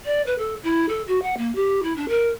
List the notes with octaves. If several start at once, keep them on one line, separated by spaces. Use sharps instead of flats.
D5
B4
A4
E4
A4
F#4
F#5
A#3
G4
E4
D4
A#4